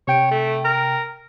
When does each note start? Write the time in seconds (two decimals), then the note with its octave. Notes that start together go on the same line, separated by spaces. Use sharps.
0.07 C3 C#5 G5 D7
0.31 A3
0.65 A#4